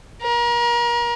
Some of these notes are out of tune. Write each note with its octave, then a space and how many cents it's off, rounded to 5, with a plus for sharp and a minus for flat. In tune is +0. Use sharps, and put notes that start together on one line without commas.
A#4 +35